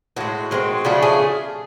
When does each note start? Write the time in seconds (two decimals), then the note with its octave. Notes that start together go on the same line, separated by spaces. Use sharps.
0.17 A2 F3 F#4
0.20 G#3
0.51 D#3 G#3 C4
0.85 C#3 F3 A3 D4 F#4
1.02 G#4